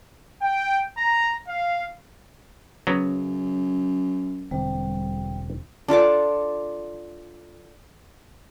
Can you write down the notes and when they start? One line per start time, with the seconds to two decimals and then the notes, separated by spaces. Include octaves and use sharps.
0.41 G5
0.98 A#5
1.48 F5
2.87 F#2 C#3 F#3 B3
4.51 E1 D3 G3 C4
5.88 D4 F4 A4 D6